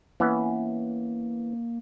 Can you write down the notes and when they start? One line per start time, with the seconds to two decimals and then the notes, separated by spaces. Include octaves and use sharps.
0.20 E3 A#3 B3 C#4